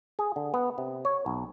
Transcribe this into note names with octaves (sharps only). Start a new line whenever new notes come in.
G#4
D3
B3
C3
C#5
B1